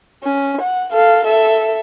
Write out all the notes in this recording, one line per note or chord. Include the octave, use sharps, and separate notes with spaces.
C#4
F#5
A4 F5
A4 E5